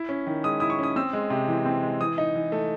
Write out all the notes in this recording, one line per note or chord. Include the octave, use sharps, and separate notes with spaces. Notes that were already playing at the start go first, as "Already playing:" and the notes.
Already playing: E4
C#4
D#3
G#3 D#6
E4 D#6
C#6
C#4 D#6
C4 E6
G#3
C3
E3
C4
G#3
E3 D#6
D#4
E3
A3